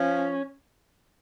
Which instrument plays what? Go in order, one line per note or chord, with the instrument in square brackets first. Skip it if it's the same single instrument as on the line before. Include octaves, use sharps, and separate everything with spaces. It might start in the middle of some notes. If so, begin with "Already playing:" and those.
Already playing: [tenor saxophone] F3 [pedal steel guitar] C#4